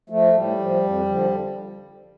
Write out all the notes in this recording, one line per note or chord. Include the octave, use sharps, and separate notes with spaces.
F3 A3
A2 G3
F3
F2
D3 F3